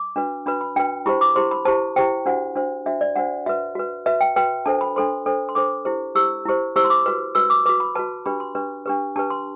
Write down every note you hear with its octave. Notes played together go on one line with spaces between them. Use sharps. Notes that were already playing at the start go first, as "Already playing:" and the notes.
Already playing: D6
D4 F#4 B4
D4 F#4 B4 B5
B5
D4 F#4 B4 G5
E4 G4 C5 B5
D6
E4 G4 C5 C6
B5
E4 G4 C5 A5
E4 G4 C5 G5
D4 F#4 C5 F#5
D4 F#4 C5
D4 F#4 C5 E5
D5
D4 F#4 C5 F#5
F#4 B4 E5
F#4 B4
F#4 B4 E5
G5
F#4 B4 G5
D4 A4 C5 A5
B5
D4 A4 C5 C6
D4 A4 C5
C6
D4 A4 C5 D6
E4 G4 C5
E4 G4 C5 E6
E4 G4 C5
E4 G4 C5 E6
C6
D6
F#4 B4
F#4 B4 E6
D6
F#4 B4 D6
B5
F#4 B4 A5
D4 G4 B4 B5
C6
D4 G4 B4
D4 G4 B4
D4 G4 B4 A5
C6